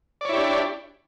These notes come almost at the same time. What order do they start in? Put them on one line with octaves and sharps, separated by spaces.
D5 C#5 E4 G4 D4